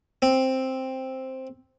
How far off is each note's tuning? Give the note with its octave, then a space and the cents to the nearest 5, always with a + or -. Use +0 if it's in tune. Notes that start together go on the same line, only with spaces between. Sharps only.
C4 +5